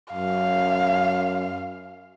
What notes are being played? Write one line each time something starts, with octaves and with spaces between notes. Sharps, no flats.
F#2 F5